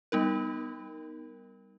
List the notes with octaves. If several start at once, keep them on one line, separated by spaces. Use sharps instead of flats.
G3 B3 D#4 A#4